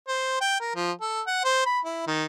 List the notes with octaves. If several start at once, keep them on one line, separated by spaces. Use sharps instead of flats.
C5
G5
A#4
F3
A4
F#5
C5
B5
E4
D#3